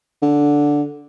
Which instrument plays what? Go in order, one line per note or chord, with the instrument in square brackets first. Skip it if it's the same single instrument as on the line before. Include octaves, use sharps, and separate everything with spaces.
[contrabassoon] D3